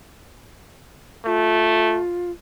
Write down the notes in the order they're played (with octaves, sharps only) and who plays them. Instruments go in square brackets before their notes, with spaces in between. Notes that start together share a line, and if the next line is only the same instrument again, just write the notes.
[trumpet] A3 [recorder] F4